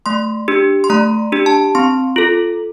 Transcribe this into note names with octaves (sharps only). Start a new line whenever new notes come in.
A3 C6
D4 G4
C6
A3 A#5
D4 G4
A5
C4 C6
F4 A4